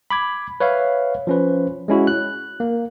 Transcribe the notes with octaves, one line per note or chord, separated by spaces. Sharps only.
B5 D6 G#6
B4 C#5 E5 F5
F3 C#4 B4
G#3 C#4 E4 F#4
F#6
A#3